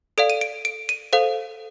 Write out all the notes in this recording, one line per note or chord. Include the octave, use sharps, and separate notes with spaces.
A4 D5 F5 D7
D#7
D7
D7
D#7
A4 C5 F5